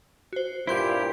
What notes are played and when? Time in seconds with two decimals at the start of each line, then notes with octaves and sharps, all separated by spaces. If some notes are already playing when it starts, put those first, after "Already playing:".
0.33 F#4 C5
0.67 G2 A#2 E4 G4 C5 C6 G6